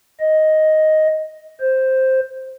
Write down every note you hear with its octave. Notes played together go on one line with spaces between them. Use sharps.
D#5
C5